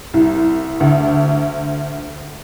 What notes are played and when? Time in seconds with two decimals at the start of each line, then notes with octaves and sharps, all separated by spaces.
0.14 C2
0.80 D2